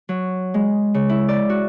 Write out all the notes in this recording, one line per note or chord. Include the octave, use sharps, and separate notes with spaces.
F#3
G#3
C#3
E4
D5
F#4